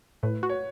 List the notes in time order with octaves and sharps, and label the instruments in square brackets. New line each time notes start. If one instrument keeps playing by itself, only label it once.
[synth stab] A2 [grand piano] B4
[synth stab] F#4
[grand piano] C#5